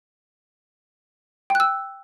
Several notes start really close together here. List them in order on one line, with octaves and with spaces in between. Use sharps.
G5 F#6 E6